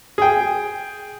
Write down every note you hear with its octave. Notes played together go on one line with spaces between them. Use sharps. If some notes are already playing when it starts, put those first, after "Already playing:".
G#4 G5